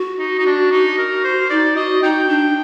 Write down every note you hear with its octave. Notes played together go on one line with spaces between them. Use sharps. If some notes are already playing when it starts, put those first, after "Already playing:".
Already playing: F#4
D#4
D#4
D4
D#4
A#4
C5
D#4 D5
F#4 D#5
D#4 G5
D4